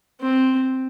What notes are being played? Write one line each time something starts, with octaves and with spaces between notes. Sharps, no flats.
C4